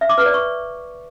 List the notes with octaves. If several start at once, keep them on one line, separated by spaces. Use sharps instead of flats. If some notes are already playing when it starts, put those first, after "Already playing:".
E5
D6
B4
D5
C#6